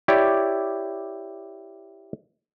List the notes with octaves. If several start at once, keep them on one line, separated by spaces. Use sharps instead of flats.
E4 G4 C#5 D5